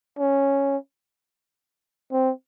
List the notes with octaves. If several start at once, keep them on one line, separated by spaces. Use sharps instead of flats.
C#4
C4